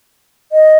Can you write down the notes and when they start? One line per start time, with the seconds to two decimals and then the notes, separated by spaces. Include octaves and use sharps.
0.52 D#5